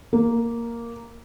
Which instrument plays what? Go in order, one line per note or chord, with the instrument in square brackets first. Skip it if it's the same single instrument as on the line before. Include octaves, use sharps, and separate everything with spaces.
[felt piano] A#3